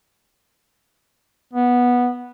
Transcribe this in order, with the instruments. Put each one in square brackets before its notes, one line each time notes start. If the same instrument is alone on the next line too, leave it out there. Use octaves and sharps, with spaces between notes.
[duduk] B3